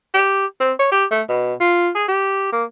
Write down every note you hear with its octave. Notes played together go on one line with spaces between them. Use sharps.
G4
C4
C#5
G4
A3
B2
F4
G#4
G4
A#3